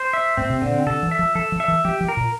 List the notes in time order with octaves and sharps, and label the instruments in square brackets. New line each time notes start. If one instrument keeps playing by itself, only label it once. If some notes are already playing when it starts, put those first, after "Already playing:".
Already playing: [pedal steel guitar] C5
E5
[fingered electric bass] A2 [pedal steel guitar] C4
[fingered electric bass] C3
[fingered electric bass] A#2 [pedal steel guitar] D3
[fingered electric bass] C3 [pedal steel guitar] A4
[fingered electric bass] E3
[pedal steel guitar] E5
[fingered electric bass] F3
[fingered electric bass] F3 [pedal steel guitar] A4
[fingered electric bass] F3
[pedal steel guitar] E5
[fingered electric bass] E3
[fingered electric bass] F3 [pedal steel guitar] G4
[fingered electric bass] F3
[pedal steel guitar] A#4
[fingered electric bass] A#2